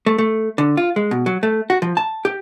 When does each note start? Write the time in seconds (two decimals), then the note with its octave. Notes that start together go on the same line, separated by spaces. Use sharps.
0.06 A3
0.18 A3
0.58 D3
0.77 F4
0.96 G#3
1.11 B2
1.26 F#3
1.43 A3
1.70 F#4
1.82 F3
1.97 A5
2.25 G4